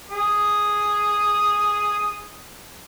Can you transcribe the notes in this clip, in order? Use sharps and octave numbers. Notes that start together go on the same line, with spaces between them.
G#4 D#6